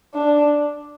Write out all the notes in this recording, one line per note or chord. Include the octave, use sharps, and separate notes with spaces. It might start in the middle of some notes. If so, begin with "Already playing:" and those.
D4